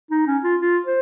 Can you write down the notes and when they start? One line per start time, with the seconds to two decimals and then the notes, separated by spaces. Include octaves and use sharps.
0.11 D#4
0.27 C#4
0.44 F4
0.60 F4
0.86 C5